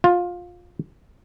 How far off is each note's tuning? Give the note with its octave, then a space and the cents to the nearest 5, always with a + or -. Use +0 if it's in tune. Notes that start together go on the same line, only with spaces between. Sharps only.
F4 +20